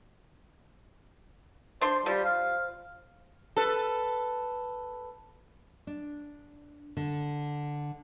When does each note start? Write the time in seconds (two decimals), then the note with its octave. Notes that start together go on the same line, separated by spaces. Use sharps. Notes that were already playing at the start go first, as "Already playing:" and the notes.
1.81 D4 C5 C6
2.06 F3 G3
2.25 F5
3.57 A4 B4
5.87 D4
6.97 D3